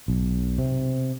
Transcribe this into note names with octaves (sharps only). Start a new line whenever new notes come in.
B1
C3